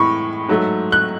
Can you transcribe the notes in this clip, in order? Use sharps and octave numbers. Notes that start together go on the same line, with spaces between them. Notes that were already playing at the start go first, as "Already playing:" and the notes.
Already playing: A2 E3 G#3 B5 C#6
G#2 F#3 A3
F#6